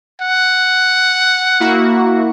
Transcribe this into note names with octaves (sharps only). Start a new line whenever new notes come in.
F#5
A#3 E4 F#4